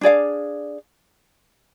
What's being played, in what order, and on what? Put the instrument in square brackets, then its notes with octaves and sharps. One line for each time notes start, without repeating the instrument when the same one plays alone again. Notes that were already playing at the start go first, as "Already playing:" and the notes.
[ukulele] D4 G#4 D5 F5